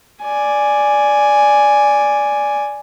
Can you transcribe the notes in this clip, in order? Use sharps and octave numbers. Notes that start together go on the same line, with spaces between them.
D5 G#5